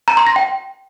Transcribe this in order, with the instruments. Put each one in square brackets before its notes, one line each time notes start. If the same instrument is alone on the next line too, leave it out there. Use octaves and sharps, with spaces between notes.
[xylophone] A#5
C6
A#6
G5